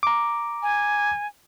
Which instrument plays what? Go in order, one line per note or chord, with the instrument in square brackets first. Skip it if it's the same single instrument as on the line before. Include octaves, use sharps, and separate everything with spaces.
[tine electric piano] A#5 D6
[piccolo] G#5